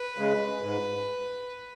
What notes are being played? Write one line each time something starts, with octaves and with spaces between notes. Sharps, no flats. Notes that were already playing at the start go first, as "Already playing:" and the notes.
Already playing: B4
C#3 G#3
G#2